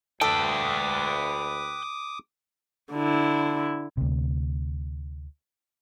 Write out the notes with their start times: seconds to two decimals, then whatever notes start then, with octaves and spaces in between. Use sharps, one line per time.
0.21 D2 A4 B4 G5 D6 D#6
2.93 D3 E4
3.97 D2 C3